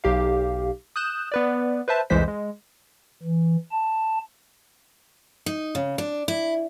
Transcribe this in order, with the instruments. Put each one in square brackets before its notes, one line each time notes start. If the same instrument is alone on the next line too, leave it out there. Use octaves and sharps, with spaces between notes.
[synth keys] B1 G4 F5
D#6 F#6 G6 E7
B3 B4 D5
B4 C5 E5 A5
C2 F2 E3 G#3 C5 B6
G#3
[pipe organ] E3
A5
[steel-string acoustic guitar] D#4
C#3
D4
E4